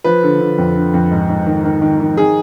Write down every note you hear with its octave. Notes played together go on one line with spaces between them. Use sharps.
F3 B4
D3
D3
F2
D3
F2
G#2
G#2
D#3
D#3
D#3
D#3
D#3 G#4